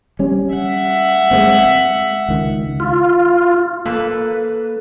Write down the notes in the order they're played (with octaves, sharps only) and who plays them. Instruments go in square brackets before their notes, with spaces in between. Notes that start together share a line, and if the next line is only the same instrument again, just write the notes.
[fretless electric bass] G3 C#4
[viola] E5 F#5
[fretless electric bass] G#3 A#3 C4
C#2 D#3
[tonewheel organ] F4
[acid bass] A#3 [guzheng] A4 B4